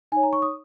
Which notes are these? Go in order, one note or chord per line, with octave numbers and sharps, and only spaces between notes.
D#4 C#5 G#5
A#5
C#6
D#6